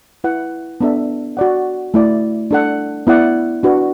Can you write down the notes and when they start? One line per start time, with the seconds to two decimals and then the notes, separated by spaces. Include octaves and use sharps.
0.24 E4 B4 F#5
0.81 B3 D4 A4 E5
1.37 F#4 D5 F#5
1.94 A3 E4 D5
2.51 D4 A4 F#5
3.07 B3 E4 D5 F#5
3.63 D4 F#4 B4